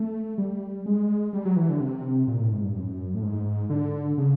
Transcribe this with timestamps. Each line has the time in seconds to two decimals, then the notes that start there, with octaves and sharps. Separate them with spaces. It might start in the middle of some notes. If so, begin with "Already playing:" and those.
Already playing: A3
0.38 G3
0.86 G#3
1.33 G3
1.45 F#3
1.56 E3
1.69 D3
1.80 C3
2.28 A#2
2.40 A2
2.52 G#2
2.63 G2
2.75 F#2
3.15 A2
3.23 G#2
3.70 D3
4.18 C#3